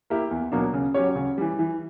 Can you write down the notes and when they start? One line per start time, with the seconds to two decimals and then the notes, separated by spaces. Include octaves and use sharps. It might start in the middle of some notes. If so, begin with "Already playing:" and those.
0.10 A#3 E4 G4
0.31 E2
0.52 B2 F#3 A#3 D4
0.74 C#3
0.94 F#3 C#4 G4 C#5
1.16 C#3
1.38 E3 G3
1.59 E3